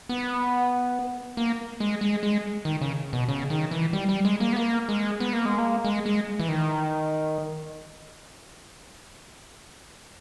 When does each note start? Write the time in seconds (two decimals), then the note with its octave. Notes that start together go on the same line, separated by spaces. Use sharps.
0.09 B3
1.37 A#3
1.80 G#3
2.01 G#3
2.23 G#3
2.65 D#3
2.81 C#3
3.13 B2
3.29 C#3
3.50 D#3
3.71 E3
3.93 G3
4.09 G3
4.25 G#3
4.40 A#3
4.52 B3
4.56 A#3
4.89 G#3
5.20 B3
5.33 A#3
5.45 G#3
5.58 A#3
5.85 G#3
6.06 G#3
6.40 E3
6.49 D#3